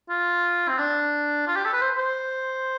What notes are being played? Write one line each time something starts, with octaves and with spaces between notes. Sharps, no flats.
F4
C4
D4
F4
G4
A4
B4
C5
C5